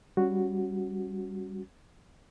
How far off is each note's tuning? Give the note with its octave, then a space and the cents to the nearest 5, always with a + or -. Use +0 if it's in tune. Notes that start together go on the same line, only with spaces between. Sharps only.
G3 +0 C#4 +0 F#4 +0